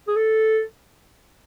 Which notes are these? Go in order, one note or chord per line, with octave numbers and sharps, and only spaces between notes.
G#4
A4